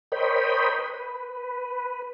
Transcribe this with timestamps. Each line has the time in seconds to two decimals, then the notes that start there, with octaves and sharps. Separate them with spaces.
0.12 A#4 C5 C#5 D#5 G5 B5
0.79 B4